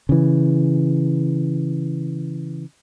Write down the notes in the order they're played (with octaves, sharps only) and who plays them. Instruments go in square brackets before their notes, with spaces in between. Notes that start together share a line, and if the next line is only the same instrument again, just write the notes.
[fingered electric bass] C#3 E3